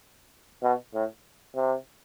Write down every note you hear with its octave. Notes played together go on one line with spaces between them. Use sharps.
B2
A2
C3